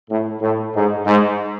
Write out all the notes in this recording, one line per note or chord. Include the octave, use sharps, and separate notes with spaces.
A2
A2
G#2
G#2